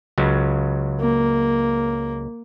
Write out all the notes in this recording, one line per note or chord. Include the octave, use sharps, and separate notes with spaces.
C#2 C#3 F#3
A#3